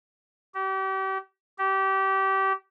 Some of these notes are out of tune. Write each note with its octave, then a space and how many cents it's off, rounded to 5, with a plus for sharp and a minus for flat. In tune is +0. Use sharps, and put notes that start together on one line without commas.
G4 -35
G4 -25